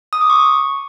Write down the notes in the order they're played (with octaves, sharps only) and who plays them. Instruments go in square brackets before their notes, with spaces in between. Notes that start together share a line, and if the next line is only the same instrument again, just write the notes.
[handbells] D#6
D6
C#6